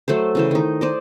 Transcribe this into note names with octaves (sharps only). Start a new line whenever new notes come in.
F#3 A3 A4 C5
C#3 E3 C5
D#3 D#4
C5 D5 D#5